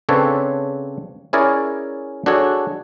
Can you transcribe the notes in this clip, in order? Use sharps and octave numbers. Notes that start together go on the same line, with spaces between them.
C#3 C4 D4 A4 B4 C#5
C#4 E4 G#4 A#4 C#5 D5
D4 F#4 G#4 A4 C#5